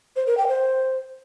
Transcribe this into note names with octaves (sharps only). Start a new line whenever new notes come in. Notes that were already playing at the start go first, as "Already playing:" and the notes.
C5
A#4
G5
C5